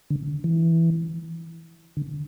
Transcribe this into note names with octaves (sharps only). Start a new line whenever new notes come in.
D3
E3
D3